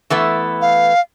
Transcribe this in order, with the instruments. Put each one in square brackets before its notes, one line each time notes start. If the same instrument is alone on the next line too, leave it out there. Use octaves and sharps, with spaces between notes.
[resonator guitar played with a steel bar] E3 A3 B3
[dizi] F5